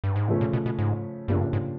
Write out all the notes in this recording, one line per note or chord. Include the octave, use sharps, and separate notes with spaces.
G2
G#2
A2 C#3 F3 A3 C#4
A#2
B2
B2
G#2
G2 C#3 F3 A#3 D4 G4
F#2
G2
G#2